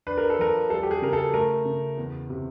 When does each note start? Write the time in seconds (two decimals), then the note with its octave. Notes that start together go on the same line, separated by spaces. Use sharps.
0.07 D4 B4
0.17 A#4
0.30 A4
0.39 F3 A#4
0.70 G3 A4
0.83 G4
0.91 G#4
1.02 C#3 A#4
1.13 A4
1.34 A3 A#4
1.65 C#3
1.97 E2
2.30 C3